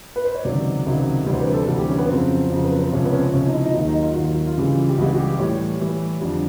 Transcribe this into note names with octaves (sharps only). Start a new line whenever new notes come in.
B4
C5
C#5
C#2 C3 D#3 F#3 D5
C#2 C3 D#3 F#3
D2 C3 E3 G3 C5
B4
A4
D2 C3 E3 G3 A4
G4
C#4
B3
F2 C#3 F#3 C4
F2 C#3 F#3
B3
C4
C#2 C3 F3 C#4
B3
C#4
C4
C#2 C3 F3 C#4
D#4
E4
D#4
D#2 D#3 F#3 D#4
D#4
F4
D#2 D#3 F#3 F#4
F4
F#4
F4
C#2 C#3 E3 G3
G4
C#2 C#3 E3 G3 F#4
F#4
G4
A2 E3 G3 C#5
A2 E3 G3
F2 D3 G3